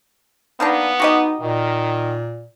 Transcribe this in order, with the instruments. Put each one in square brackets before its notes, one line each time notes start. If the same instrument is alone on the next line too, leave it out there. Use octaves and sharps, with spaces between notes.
[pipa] D#3 A#3 D4 [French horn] B3
[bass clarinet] D#4 [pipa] F#4 G4 D#5
[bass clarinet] A#2 [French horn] D#3